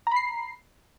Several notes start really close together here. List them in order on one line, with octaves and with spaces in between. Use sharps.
A#5 B5 C7